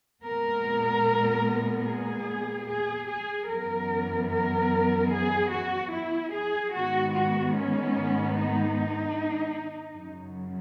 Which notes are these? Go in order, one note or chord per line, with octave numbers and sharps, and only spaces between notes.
A#2 G#3 B3 A#4
G#4
G#4
G#4
F#2 E3 B3 A#4
A#4
G#4
F#4
E4
G#4
G#2 D#3 G#3 B3 F#4
F#4
C#4
D#4
F#2 C#3 F#3